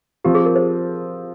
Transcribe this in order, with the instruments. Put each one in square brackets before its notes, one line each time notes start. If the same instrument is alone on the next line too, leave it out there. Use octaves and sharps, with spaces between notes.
[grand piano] F3 C4 F4 [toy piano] G4
[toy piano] G#4
A#4
C5